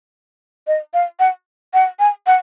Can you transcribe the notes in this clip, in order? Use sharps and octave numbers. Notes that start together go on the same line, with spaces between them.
D#5
F5
F#5
F#5
G#5
F#5